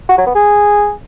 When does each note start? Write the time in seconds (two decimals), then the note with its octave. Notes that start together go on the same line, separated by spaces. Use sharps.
0.09 F#4
0.18 F#3
0.27 B3
0.35 G#4